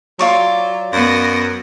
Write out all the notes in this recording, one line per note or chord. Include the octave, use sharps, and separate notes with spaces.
F#3 F4 D5 C#6
F#2 B3 A#6